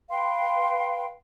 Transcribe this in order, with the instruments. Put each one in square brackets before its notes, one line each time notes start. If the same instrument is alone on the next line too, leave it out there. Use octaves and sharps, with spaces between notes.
[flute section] B4 F5 G5 C6